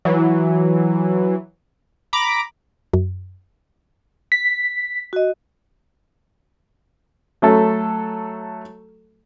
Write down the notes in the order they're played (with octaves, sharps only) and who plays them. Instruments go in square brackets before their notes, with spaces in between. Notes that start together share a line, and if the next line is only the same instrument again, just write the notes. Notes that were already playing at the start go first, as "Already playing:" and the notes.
[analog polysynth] E3 F#3
A#5 B5 D6
[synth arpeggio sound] F#2
[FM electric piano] B6
[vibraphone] F#4 D#5
[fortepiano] F#3 A3 A4